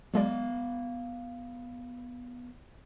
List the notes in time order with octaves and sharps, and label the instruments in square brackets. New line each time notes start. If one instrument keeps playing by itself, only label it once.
[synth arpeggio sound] F#3 G#3 D5 [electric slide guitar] B3 F5